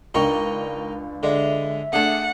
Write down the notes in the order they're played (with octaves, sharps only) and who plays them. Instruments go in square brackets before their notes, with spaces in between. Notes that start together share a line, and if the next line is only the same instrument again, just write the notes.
[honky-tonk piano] C#2 D4 C#6 [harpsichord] D#4 A#4 G5
[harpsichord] D3 G#3 [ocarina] E5
[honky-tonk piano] A3 D4 [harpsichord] G#4 A4 [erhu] F#5